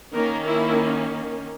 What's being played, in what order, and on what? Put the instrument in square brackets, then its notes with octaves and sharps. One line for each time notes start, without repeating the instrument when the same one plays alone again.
[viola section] D#3 A#3 C#4 A#4
E4